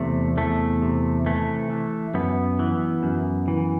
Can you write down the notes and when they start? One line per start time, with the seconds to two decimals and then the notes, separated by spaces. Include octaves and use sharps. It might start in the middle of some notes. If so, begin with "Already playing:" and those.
Already playing: E2 C3 A3
0.37 E2 A3
0.82 C3
1.26 E3 A3
1.70 E3
2.14 F#2 B3
2.59 E3
3.03 F#2
3.48 E3